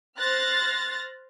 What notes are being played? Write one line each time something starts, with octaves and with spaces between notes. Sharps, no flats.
C5 F6 F#6 A6 A#6